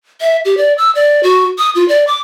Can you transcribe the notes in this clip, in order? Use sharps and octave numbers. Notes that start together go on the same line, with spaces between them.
E5
G4
D5
E6
D5
F#4
D#6
F4
D5
D6